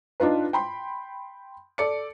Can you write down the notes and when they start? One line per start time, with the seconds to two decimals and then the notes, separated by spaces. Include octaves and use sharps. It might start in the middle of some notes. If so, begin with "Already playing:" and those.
0.20 D4 D#4 F4 B4
0.53 G5 B5 C6
1.78 A4 D5 C#7